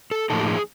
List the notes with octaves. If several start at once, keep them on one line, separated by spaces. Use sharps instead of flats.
A4
A2 F3 A#3 D#4 A4
G4
G#4